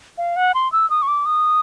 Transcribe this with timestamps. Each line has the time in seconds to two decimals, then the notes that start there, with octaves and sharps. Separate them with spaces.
0.18 F5
0.36 F#5
0.55 C6
0.72 E6
0.90 D#6
1.02 C#6
1.08 D6
1.26 D#6